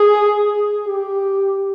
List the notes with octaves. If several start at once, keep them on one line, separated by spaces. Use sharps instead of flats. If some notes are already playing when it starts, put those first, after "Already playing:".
Already playing: G#4
G4